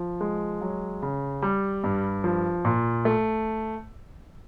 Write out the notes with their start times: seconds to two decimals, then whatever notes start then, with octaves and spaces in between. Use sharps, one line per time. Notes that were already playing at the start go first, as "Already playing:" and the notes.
Already playing: F3
0.21 G#3
0.61 F#3
1.02 C#3
1.42 G3
1.84 G2
2.24 F3
2.65 A#2
3.05 A3